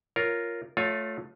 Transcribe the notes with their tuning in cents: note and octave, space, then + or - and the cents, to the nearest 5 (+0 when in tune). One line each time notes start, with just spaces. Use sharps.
F4 +0 A#4 +0 C#5 +0
A3 +0 F4 +25 C#5 +5